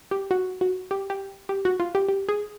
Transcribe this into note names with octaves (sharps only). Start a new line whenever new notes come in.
G4
F#4
F#4
G4
G4
G4
F#4
F4
G4
G4
G#4